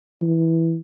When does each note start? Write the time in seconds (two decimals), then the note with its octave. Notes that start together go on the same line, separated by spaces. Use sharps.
0.22 E3